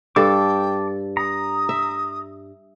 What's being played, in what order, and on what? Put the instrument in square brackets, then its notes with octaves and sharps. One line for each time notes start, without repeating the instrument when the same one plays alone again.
[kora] G2 A4 [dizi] G5 [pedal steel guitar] A5 D6
[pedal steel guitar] A#5 [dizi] D#6
[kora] E5